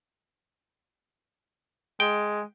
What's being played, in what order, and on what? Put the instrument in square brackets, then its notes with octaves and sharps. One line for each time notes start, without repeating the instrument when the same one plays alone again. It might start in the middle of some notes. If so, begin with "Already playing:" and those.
[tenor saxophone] G#3 [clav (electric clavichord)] G5